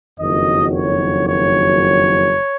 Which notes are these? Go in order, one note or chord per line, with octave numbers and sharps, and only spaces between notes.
F#1 F2 D#3 F#3 D#5
C#5
C#5